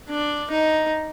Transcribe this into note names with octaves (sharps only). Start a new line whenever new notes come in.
D4
D#4